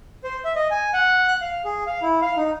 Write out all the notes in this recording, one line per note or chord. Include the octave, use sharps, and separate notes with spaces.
C5
E5
D#5
G#5
F#5
F#6
F5
G#4
F5
E4
F5
D#4